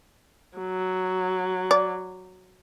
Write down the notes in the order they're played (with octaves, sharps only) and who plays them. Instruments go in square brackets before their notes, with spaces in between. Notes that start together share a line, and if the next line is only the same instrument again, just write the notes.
[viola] F#3
[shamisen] D5